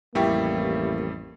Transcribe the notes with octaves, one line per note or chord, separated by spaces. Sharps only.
A1 F2 G3 A#3 E4 G4 C#6